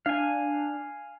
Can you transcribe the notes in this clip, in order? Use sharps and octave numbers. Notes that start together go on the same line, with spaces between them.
D4 F5 G#5